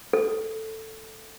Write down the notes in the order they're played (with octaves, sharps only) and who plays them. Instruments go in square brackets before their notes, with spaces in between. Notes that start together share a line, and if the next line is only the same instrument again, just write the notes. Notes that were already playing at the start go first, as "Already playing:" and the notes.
[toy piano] A4